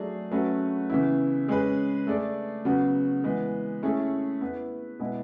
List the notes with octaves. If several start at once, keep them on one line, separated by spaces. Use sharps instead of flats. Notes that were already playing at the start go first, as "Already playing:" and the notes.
Already playing: F#3 A3 D4 G#4
F#3 A3 C#4 F#4 B4
C#3 E3 B3 E4
G#3 C#4 G#4 B4
A3 D4 G#4 D5
C#3 F#3 B3 F#4
E3 G#3 B3
A3 C#4 E4 G#4
B3 E4 B4
B2 G#3 B3 E4